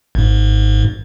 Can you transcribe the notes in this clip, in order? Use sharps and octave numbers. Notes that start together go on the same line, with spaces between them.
G#1 G#2